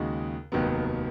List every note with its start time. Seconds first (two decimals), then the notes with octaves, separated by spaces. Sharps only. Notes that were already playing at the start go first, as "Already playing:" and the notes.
Already playing: D#2 C#3 G#3 D#4 F#4
0.52 F1 D#2 D#3 F#3 B3